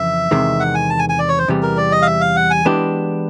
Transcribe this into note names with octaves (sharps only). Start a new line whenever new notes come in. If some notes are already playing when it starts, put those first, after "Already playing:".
Already playing: F2 C#3 E3 E5
E2 C3 D#3 G#3
F#5
G#5
A5
G#5
G#5
D5
C#5
C5
E2 C3 E3 G3
A#4
D5
D#5
F5
E5
F5
F#5
G#5
E3 G#3 B3 D4 G4